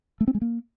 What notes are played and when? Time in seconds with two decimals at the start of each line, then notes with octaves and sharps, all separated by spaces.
0.21 A3
0.28 C4
0.35 G#3
0.41 A#3